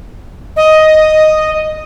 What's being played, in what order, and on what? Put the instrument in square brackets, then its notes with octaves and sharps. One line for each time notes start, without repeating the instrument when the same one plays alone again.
[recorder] D#5